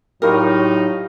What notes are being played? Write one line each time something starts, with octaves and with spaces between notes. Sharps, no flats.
A2 F#3 G3 D#4 F4 A#4 C#5